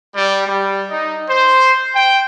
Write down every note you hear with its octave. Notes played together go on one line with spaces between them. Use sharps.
G3
G3
D#4
C5
G5